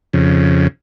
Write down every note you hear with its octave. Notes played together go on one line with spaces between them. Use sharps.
F2 C#3